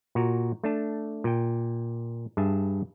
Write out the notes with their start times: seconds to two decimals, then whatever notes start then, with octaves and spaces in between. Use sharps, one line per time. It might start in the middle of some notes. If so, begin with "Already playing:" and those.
0.15 A#2 F#4 A#5
0.64 A3 D4 A5
1.24 A#2 G5
2.37 G2 G#4 E5 A5